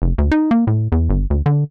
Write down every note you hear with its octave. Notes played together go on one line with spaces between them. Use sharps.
F1
D2
D#4
A#3
A2
E2
G1
D2
D3